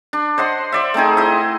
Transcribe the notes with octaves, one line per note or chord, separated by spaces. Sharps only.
D4
C5 D#5 F#5 C6
C5 D5 E5
A3 C4 D#4 G#4
E4 D#5